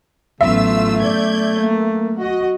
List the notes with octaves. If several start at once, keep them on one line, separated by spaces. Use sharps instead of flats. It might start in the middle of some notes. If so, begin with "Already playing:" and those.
A1 F#3 A3 B3 C#4 F4 E5 E6
D5 G6 G#6
A#3
F#4 D#5